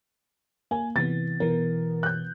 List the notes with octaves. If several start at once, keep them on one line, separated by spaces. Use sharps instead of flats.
A#3 G#5
C3 E3 B3 A6
B2 E3 B3 A#4
F#6 G6